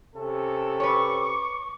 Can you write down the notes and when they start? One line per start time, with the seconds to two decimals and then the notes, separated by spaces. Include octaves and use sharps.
0.15 C3 C#4 A4
0.80 B4 C#5 C#6 D6